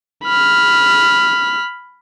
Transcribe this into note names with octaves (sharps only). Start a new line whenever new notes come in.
B5 F6